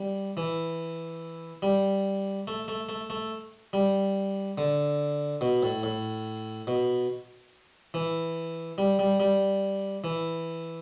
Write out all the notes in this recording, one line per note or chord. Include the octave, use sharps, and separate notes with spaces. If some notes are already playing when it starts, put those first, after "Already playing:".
Already playing: G3
E3
G3
A3
A3
A3
A3
G3
D3
B2
A2
A2
B2
E3
G3
G3
G3
E3